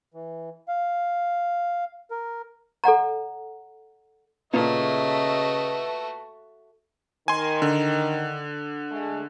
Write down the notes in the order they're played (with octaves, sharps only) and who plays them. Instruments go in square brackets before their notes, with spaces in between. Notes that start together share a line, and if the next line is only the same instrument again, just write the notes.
[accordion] E3
F5
A#4
[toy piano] A4 D5 F#5 A#5
[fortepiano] A#2 [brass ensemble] C#3 D#5 [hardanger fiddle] A3 F#4 [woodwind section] B4 E5
[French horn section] D#3 [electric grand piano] G#5 C6
[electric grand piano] D3
[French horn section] G#3 A3